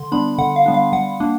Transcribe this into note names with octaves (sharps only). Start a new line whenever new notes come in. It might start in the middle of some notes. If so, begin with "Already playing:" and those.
Already playing: D3 C6
G3 B3 D4 B5
D3 F#5
F5
G3 B3 D4
F5
G3 F#5
A#3 D4